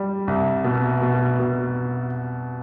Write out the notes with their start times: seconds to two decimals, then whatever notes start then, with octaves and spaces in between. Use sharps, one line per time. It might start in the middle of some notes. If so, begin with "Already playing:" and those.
Already playing: G3
0.28 C2
0.64 B2
1.02 B2
1.39 B2